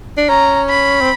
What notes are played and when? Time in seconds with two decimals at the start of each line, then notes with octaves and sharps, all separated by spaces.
0.17 D4
0.29 C#4 A#5
0.70 B5
1.01 C4